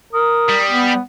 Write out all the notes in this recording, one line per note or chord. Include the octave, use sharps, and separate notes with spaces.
A#4 D#6
G3
B3